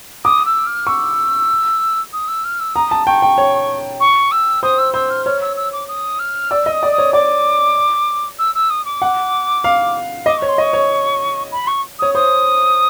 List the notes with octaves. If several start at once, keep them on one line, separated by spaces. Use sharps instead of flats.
D6 D#6
E6
F6
C#6 E6
D#6
E6
F6
E6
A#5 D#6
A5
G5 C#6
G5
C#5
C#6
E6
C5 D#6
E6
C5 E6
F6
C#5 F6
E6
E6
D6
D#6
F6
D5 E6
D#5
D#6
D5
D#6
C#5
D5 D6
E6
E6
D#6
D6
F#5
F5
D#5 D6
C#5 C#6
C6
D#5 C#6
C#5
B5
C#6
C#5 D#6
C5 D#6